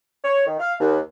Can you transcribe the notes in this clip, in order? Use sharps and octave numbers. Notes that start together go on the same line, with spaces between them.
C#5
D#3
F5
D#2